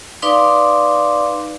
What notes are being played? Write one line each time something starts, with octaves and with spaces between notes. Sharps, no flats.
D#4 B4 D5 F5 C6 D6